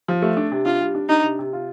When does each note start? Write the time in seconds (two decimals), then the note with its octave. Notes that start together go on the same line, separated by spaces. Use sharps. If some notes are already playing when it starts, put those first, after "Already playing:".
0.08 F3
0.22 A3
0.37 D4
0.52 C3
0.65 D4 F4
0.81 G3
0.95 D4
1.09 D4 D#4
1.23 C3
1.39 C3
1.53 F4